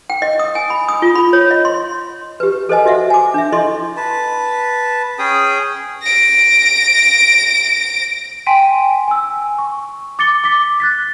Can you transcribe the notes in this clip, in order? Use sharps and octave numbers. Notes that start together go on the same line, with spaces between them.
G5
D#5
D#6
G#5
B5
D#6
F4
B5
C#5
D#5
C6
G4 B4
A4 C5 D#5 G#5
F#4 D#5 E5 F#5
G#5 D6
D4 E5
E4 A4 D#5 C6 C#6
B4 A5
C#4 G#4 G5 D#6
A#6 D7
G5 G#5 C6 B6 D7 D#7
G#5 E6
C#6
D6 A6 C#7 G7
D6 B6
F#6 A6 B6